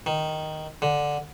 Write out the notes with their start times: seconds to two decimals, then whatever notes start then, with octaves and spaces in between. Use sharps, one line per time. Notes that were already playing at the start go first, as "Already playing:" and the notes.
0.06 D#3
0.82 D3